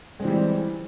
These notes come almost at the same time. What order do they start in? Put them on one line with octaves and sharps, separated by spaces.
G#3 C4 E3 G3